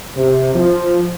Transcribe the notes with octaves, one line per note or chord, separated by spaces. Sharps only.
C3
F3